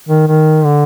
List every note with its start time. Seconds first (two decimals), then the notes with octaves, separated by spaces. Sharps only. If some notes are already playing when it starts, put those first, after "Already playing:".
0.09 D#3
0.28 D#3
0.65 D3